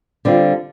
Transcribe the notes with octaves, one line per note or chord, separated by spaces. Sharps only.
D3 G3 C4 F4